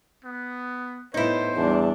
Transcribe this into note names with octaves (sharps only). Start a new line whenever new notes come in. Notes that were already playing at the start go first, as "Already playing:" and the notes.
B3
A2 B3 D#4 E4 C5
E2 G3 D4